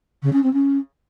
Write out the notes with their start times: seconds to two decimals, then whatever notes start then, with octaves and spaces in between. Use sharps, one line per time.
0.22 C#3
0.33 C#4
0.43 C4
0.53 C#4